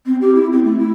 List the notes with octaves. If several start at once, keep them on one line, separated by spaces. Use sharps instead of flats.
C4
G4
E4
C4
A3
E4